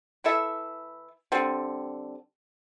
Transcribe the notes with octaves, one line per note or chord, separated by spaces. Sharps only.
E3 E4 A4 E5
D3 G3 C4